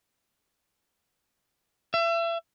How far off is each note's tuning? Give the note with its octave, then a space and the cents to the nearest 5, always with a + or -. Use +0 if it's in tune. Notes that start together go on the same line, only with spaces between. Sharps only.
E5 +35